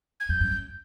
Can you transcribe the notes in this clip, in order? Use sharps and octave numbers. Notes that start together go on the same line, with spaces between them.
G#6
F2 G6
F#2
F#2